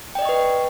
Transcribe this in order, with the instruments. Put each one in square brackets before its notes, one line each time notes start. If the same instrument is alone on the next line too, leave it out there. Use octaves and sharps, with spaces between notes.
[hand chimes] G5
D5
D#5
C#6
B4